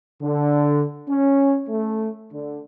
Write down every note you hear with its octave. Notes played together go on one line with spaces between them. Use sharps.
D3
C#4
A3
D3